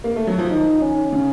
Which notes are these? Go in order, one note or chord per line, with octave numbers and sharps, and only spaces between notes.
A#3
A3
F#3
F3
D#3 D#4
C#4
C#3